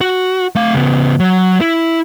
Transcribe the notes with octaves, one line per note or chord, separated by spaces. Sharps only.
F#4
A3 F5
C#3 B3
F#3
E4